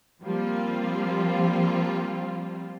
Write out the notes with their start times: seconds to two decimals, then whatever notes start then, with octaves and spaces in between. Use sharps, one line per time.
0.23 F3 G3 A#3 C4 F4